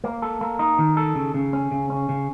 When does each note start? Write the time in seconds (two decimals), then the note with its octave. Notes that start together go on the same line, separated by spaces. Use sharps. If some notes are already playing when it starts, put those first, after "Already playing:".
0.04 A#3
0.22 A4
0.41 A#3
0.59 D#4
0.79 D#3
0.97 A4
1.15 C#3
1.34 C#3
1.53 C#4
1.71 C#3
1.90 C#4
2.09 C#3